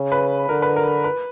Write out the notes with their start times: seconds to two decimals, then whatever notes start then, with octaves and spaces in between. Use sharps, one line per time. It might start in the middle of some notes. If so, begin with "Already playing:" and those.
Already playing: C#3
0.12 B4
0.49 D3 A#4
0.62 B4
0.76 A#4
1.04 B4